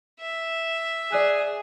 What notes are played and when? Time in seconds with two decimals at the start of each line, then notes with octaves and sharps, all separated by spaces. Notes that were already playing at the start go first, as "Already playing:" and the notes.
0.20 E5
1.12 G#4 D5 F#6